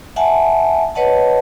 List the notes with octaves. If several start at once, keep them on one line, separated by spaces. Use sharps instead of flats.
E5 F#5 G#5 A5
B4 C#5 D#5 F#5 A5